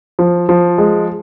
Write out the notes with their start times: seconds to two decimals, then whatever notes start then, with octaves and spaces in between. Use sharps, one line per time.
0.19 F3
0.49 F3
0.78 G#3